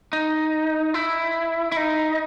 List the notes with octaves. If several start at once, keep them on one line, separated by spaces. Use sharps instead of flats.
D#4
E4
E4
D#4